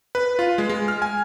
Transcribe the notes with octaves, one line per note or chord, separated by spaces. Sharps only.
B4
F4
G#3
G#3
F6
G#5